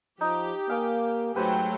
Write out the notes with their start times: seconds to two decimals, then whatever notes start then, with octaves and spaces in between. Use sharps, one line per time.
0.21 F3 D#4 G4
0.69 A#3 F5 G#5 D6
1.36 G#2 F#3 A3 G4 B4 C5